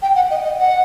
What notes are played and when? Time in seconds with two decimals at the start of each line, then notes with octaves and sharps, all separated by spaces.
0.02 G5
0.16 F#5
0.30 D#5
0.44 D#5
0.58 F#5